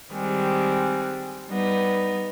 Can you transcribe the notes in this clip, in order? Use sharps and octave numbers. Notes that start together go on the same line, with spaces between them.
D#3 G3 G#3 C4
G3 B3 D#4